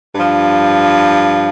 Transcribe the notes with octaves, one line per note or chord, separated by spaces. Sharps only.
G2 F3